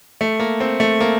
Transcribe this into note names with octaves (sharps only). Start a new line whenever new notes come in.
A3
A#3
C4
A3
A#3